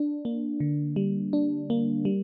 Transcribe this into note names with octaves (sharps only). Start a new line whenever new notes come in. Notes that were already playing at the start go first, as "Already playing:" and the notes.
Already playing: D4
A#3
D3
G3
D4
A#3
G3